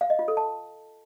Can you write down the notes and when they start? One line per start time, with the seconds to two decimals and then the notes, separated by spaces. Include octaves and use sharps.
0.01 F5
0.10 D#5
0.19 F4
0.28 A4
0.37 A5